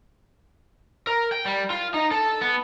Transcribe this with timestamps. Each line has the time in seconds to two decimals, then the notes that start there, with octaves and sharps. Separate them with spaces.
1.07 A#4
1.32 G5
1.45 G3
1.70 F4
1.94 D#4
2.11 A4
2.41 B3